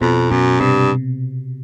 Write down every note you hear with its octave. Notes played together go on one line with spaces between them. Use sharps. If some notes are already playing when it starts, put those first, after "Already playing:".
F2 B2
F#2 B2
G2 C3